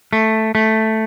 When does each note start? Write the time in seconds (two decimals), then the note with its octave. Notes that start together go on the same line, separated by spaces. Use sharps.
0.13 A3
0.55 A3